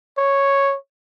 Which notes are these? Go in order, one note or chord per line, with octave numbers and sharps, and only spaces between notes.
C#5